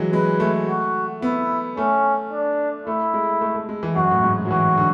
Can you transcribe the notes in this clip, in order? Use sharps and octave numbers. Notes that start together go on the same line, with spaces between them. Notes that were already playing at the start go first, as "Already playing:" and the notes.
Already playing: E3 F#3 G#3
G#3 B4
A3
F#4
B3 E4
A3 C#4
D4
A3 E4
G#3
A3
A3
G#3
E3
F#2 F#4
A2
G#2
F#3
E3 F#4
D3